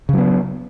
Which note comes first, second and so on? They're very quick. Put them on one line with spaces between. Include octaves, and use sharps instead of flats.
C#3 F#3 B3